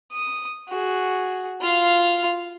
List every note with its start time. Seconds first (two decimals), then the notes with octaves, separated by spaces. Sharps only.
0.12 D#6
0.69 F#4 G#4
1.62 F4 F5